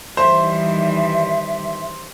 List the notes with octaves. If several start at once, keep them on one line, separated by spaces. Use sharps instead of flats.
D#3 E3 G3 C5 E5